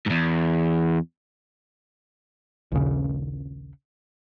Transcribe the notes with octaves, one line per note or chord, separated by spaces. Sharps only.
E2 G#2
A#1 D#2 C#3